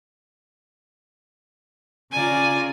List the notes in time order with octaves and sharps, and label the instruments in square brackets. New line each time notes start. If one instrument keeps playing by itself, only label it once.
[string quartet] C#3 F4 A#5 [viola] D5 G#5